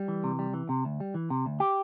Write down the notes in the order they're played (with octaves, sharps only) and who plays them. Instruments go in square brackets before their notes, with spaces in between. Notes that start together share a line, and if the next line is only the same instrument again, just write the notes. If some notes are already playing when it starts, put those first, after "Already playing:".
Already playing: [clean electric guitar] G3
E3
C3
G3
E3
C3
D2
G3
E3
C3
D2
G4